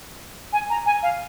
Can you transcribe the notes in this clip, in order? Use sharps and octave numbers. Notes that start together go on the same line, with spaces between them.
G#5
A#5
G#5
F5